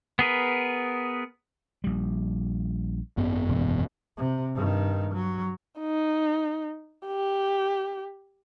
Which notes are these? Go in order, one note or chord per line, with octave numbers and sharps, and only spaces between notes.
B3 G#4 A#4 B4
A#1 G3
G#1 F#2 B3
E1
C3
G2 D#3
F#3
D#4
G4